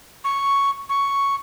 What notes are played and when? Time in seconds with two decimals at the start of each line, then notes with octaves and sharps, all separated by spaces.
0.24 C#6
0.89 C#6